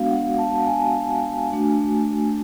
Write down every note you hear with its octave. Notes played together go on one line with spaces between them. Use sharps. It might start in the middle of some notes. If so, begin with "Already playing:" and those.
Already playing: G#3 B3 D4 F#4 F5
F#5
A5
G#5
A3 D4 F#4